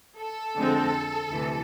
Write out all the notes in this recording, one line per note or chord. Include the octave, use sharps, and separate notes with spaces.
A4
F2 D3 G#3 C4
D2 C3 E3